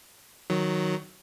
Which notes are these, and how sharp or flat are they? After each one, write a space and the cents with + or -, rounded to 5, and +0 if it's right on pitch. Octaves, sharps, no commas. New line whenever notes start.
D#3 +0 F#3 +0